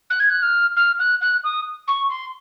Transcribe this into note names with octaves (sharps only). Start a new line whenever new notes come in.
F#6
G#6
F#6
F6
F6
F#6
F#6
D#6
C#6
C6